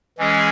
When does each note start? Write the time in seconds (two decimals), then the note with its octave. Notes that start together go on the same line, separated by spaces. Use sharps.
0.18 E3 G#3 C#4 G#4